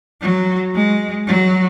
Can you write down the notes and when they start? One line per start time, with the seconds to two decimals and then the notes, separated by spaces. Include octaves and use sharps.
0.21 F#3
0.75 G#3
1.27 F#3